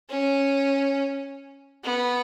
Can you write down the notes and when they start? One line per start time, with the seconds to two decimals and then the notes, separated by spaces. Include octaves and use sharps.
0.09 C#4
1.84 B3